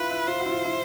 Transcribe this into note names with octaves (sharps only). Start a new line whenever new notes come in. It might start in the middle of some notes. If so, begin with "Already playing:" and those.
Already playing: E4 F4 B4
E4
F4 C5
F#4
E4
F4
E4